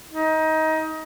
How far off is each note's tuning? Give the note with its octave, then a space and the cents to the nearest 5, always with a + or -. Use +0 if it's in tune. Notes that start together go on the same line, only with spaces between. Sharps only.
D#4 +20